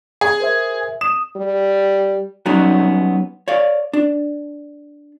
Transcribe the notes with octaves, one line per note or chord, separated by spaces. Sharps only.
G#4
A#4 C5 E5
D#6 E7
G3
F#3 G3 B3 C#4 D#4 F#4
C#5 D5 F5
D4